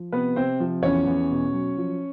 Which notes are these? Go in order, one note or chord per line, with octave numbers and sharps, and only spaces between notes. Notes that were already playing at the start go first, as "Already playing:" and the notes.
Already playing: F3
C3 B3 B4
C3 C4 C5
F3
E2 C#4 C#5
E2
B2
F#3
F3